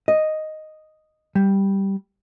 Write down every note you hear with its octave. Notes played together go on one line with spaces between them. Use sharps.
D#5
G3